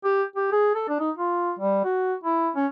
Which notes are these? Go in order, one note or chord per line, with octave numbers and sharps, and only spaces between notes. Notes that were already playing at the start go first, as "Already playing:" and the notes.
G4
G4
G#4
A4
D4
D#4
F4
G3
F#4
E4
C#4